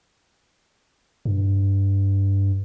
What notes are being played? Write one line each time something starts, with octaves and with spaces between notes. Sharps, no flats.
G2